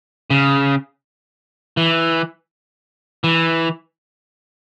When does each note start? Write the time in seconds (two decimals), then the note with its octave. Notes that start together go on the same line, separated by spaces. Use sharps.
0.30 C#3
1.77 E3
3.24 E3